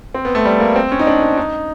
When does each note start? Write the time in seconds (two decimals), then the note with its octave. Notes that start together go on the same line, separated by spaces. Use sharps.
0.15 C4
0.25 B3
0.35 A3
0.45 G3
0.60 A#3
0.76 C4
0.92 C#4
0.99 D#4
1.07 D4
1.22 D4
1.38 D#4